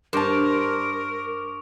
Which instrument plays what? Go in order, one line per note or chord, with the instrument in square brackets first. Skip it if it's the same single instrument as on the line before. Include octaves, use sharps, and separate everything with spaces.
[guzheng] G2 [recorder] A#4 [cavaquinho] C5 A5 [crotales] C#6 D6 F7